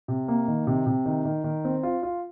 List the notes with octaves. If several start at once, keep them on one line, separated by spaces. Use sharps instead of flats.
C3
A#3
D#3
C3
C3
D#3
D#3
D#3
C4
F4
F4